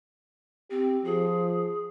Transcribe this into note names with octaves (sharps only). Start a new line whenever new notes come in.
C4 G4
F3 G#4